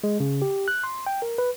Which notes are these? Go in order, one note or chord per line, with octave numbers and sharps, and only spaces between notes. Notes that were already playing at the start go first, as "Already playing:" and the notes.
G#3
C#3
G4
F#6
C6
G5
A#4
B4